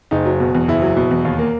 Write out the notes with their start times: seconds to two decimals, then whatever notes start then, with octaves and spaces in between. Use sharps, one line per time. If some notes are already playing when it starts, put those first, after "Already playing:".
0.11 F#1 D#4
0.26 F#3
0.40 B2
0.55 E2
0.68 F#1 E4
0.82 F#3
0.97 B2
1.11 E2
1.25 D#2
1.39 A#3